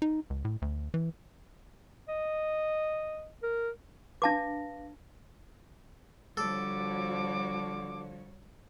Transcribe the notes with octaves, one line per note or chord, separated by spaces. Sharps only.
D#4
C#2
A2
D2
E3
D#5
A#4
D4 B4 F5 A5 D6 A#6
D3 F3 G3 F#4 A4 C#5 D6